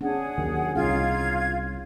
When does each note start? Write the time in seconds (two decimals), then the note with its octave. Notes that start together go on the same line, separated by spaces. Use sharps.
0.01 C#4 D4 G#4 F#5
0.38 D#2 D#3 F#3
0.75 C2 C#4 D#4 F4 G#4 F5 G#6